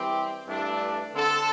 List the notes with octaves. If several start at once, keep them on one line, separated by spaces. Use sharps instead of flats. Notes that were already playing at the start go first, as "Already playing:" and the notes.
Already playing: E3 G3 C4 G4
G2 E3 A3 D4 A4
D3 C4 A4